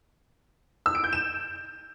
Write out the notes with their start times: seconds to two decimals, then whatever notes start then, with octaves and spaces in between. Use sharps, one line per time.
0.86 E6
0.95 D7
1.04 G6
1.13 E7